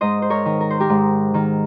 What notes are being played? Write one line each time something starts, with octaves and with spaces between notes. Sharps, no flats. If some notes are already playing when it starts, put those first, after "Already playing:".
G#2 C5 D#5
C5
A#4 C#5
D#3
A#4
C5
G4 A#4
G#2
D#3